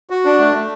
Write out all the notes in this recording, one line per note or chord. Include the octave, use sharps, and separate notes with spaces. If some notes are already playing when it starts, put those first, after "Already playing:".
F#4
D4
A3
A3